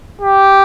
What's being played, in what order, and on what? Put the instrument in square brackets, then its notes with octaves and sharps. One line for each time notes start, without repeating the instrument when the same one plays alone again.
[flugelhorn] G4